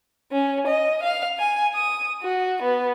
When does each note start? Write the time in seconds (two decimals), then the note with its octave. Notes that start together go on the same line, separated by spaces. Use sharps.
0.32 C#4
0.68 D#5
1.03 F5
1.39 G#5
1.75 D#6
2.23 F#4
2.63 B3